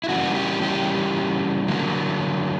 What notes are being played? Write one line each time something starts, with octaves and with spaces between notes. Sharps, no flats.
E4
C#3 E3 G3 A#3 F#4
G4
G4
D3 F#3 A#3